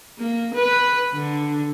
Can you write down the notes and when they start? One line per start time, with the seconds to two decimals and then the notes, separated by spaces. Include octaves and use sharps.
0.19 A#3
0.54 B4
1.14 D3